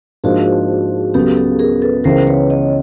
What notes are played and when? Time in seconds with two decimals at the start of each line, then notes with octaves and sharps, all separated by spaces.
0.24 G#2 F3 A#3 D4 F4 F#4 G#4
1.14 C#2 C#3 F#3 B3 G4 A4
1.37 G4 A4
1.59 G#4 A#4
1.82 A4 B4
2.04 C#2 C#3 E3 A#4 C5
2.27 B4 C#5
2.50 C#5 D#5